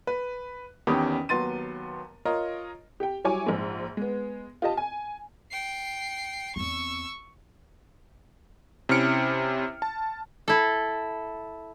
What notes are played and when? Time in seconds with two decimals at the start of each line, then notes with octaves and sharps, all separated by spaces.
0.07 B4
0.87 E2 D#3 C#4 G4 B5 D#6
1.29 D#2 F#3 B3 C6 A6 D#7
2.25 F4 A#4 C#5 D#5
3.00 G4 G5
3.24 F#3 G3 E4 C#5 G#5 D6
3.47 A#1 G#2
3.97 G#3 B3
4.62 F4 G4 D#5 A5
4.77 G#5
5.51 G5 C7
6.56 E2 C4 C#6 E6
8.89 C3 C#4 E4 F6 C#7 D7
9.82 A5
10.48 E4 A4